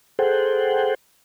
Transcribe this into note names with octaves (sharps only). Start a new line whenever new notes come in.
G#4 A4 C5 F#5 G5